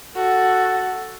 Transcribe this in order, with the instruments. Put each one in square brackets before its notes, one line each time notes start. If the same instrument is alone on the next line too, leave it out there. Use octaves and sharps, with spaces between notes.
[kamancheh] F#4 [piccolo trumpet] A4